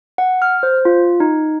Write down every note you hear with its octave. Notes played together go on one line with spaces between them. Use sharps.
F#5
F6
C5
F4
D#4